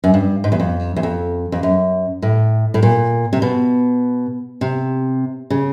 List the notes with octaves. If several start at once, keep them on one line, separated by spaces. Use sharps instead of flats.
F#2
G2
G#2
E2
F2
E2
F2
F2
F#2
A2
A2
A#2
C3
B2
C3
C#3